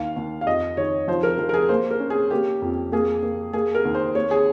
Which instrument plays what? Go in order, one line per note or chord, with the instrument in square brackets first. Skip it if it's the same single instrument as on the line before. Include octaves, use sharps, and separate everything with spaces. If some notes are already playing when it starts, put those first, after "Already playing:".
Already playing: [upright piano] D#2 F5
D#2
F5
F2 D#5
D#3 C#5
F3 C5
A#4
F3 A#4
A#4
G#4
A#3 C5
A#4
C#4
G#4
A#3 G4
F2
A#3 G#4
A#3
A#3 G#4
A#4
D#2
C5
A#3 C#5
G#4